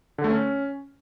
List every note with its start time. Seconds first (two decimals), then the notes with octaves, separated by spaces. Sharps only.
0.18 D3
0.24 A3
0.30 C#4